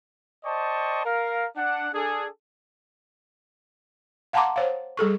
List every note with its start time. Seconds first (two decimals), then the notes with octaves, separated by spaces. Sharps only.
0.45 C5 D5 D#5 G5 A5 C#6
1.05 A#4 F5
1.56 D4 F#5
1.94 D4 G#4 A4
4.33 F5 F#5 A5 A#5 C6 D6
4.56 C5 C#5 F5
4.97 G3 G#4 A4 C#6